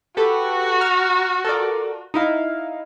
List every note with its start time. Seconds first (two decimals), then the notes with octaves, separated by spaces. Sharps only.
0.17 F#4 G4 A4 B4
0.80 A#5 F6
1.45 A4 A#4 D5
2.14 D#4 E4 F5